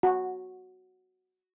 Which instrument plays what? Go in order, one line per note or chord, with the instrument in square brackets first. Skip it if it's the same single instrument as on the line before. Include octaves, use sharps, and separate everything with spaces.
[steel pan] F#4